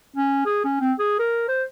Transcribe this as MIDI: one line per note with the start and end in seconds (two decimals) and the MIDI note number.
0.16 0.43 61
0.46 0.63 68
0.64 0.77 61
0.80 0.92 60
0.99 1.18 68
1.19 1.43 70
1.48 1.63 72